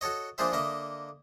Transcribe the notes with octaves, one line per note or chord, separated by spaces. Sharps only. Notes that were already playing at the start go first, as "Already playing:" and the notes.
F#4 A4 C#5 D#5
F3 A#3 D4 G#4 C5 E5
D3 A#3 D#5 E5